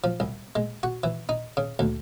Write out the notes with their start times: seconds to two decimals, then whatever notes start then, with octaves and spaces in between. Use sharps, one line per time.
0.04 F3
0.20 C2
0.56 G#3
0.83 F#4
1.04 E3
1.29 D#4
1.57 C#3
1.79 D2